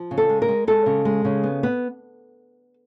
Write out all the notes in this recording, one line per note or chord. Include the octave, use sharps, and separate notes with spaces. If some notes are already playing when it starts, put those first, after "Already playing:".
Already playing: F3
C#3
A4
G#3
A#4
G#3
G#3 A4
C#3
G#3
C#3
B3
B3